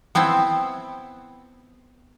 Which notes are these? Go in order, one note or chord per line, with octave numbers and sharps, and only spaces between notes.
B3 C4 E4 A5